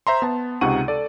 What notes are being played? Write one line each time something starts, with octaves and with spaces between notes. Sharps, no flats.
C5 E5 A#5 C6
B3 A5
C#2 C3 D#4 F#5 C#6 D#7
A4 D5